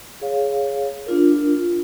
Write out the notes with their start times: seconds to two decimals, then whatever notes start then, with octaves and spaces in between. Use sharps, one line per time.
0.21 G#4 C#5 F5
1.06 D4 F4 A#4